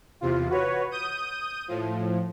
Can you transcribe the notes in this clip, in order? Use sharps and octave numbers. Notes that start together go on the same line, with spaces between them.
E2 C3 F4
F#4 B4 C#5
D#6 G6 D#7
A2 F3